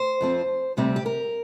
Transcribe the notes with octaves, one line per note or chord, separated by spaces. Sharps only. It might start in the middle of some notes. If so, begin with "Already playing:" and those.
Already playing: C5
F2 F3 C4
D2 C3 G3 C4
G4
A#4